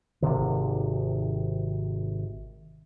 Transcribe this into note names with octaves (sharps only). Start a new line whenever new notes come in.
G#1 C#2 C3 D#3